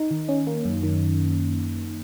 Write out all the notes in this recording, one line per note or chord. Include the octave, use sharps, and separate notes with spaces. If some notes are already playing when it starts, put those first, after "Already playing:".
Already playing: D#4
D#3
C#4
A#3
F#2
D#3